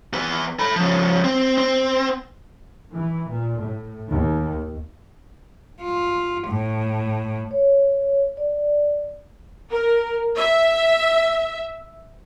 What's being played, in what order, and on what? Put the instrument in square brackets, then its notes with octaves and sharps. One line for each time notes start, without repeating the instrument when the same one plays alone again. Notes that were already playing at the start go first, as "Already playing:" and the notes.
[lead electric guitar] E2 B4
A4 B5
C#3 F3
C4
C4
[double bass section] E3
A#2
A2
D#2
[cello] F4
A2
[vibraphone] C#5
D5
[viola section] A#4
E5